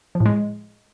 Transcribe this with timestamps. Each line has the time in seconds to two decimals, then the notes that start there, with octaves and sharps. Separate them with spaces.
0.15 F3
0.20 A2
0.26 G#3